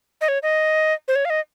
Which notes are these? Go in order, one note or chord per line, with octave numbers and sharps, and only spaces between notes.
D#5
C#5
D#5
C5
C#5
F5
D#5